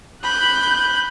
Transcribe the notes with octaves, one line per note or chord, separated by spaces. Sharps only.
B5 F#6 G6